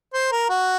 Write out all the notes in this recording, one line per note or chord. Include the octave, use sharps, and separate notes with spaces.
C5
A#4
F#4